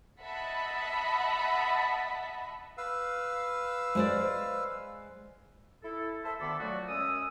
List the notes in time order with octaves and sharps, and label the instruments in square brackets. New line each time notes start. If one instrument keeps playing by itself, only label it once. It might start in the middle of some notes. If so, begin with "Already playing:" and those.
[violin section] D#5 E5 F#5 A5 B5
[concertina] B4 F5 E6
[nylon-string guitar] G#3 C5 D5
[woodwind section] E4 A4
A4 C5 E5
D2 D#3 B3 A4 B5 D6
F3 F#3 A3 F#4 D5
F#2 G#3 C#4 D#6 E6